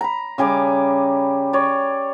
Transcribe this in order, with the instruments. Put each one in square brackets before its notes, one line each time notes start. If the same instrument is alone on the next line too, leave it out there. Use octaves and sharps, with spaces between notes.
[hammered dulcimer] A#5 B5
C#3 G3 G#5 D6
C#5 D5